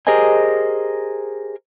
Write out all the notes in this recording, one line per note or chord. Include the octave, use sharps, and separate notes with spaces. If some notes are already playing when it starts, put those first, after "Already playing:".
G4 G#4 A#4 C5 D#5 G#5